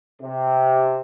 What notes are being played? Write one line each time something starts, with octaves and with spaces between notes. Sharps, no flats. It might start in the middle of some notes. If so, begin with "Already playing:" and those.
C3